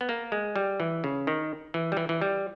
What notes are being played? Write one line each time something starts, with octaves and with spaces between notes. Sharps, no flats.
B3
A#3
G#3
G3
E3
C#3
D#3
E3
G3
E3
E3
G3